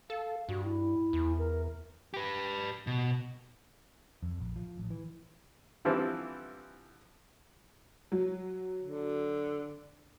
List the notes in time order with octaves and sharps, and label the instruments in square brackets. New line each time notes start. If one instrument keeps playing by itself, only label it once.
[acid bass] A4 [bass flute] F5
[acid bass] G2 [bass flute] F#4
[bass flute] E4
[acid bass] E2
[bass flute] A#4
[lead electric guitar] G4 B4
B2
[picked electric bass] F2
A#1
F3
A1
E3
[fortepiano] D3 E3 F3 G3 C4 E4
[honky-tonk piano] F#3
[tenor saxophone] D3